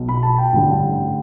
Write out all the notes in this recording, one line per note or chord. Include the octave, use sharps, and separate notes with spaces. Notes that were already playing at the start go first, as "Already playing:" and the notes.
Already playing: B1 B2
B5
A5
G5
A1 G2 D3